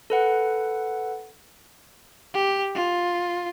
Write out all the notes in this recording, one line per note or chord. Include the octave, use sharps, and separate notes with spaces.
A4 B4 F#5
G4
F4